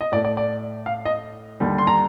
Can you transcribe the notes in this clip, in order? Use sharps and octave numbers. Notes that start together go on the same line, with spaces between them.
D#5
A2 A3 D5
D5
D5
F5
D#5
D#2 D3 G3
C6
A#5